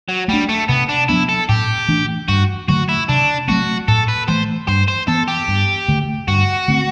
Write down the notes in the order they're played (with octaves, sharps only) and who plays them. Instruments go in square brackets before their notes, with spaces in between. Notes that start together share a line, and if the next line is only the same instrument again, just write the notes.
[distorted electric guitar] F#3
[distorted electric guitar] G3 [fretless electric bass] A3 D4
[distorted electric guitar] A3
[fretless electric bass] C3 [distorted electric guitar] B3
[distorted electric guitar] D4
[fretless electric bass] F#3 B3 D4 [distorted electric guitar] E4
[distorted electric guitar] A4
[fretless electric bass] A2 [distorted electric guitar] G4
[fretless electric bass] E3 A3 D4
[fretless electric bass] G2 [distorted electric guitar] F#4
[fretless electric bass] D3 F#3 A3 [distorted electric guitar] F#4
[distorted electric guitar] E4
[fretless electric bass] C3 [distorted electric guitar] D4
[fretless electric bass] F#3 A3 C4 [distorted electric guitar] F#4
[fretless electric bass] A2 [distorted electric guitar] A4
[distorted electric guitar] B4
[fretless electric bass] E3 A3 [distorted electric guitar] C5
[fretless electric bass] G2 [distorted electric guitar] C5
[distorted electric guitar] C5
[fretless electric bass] E3 B3 [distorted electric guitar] A4
[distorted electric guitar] G4
[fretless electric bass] G2
D3 A3
[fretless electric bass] G2 [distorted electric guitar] F#4
[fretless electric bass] D3 A3 C4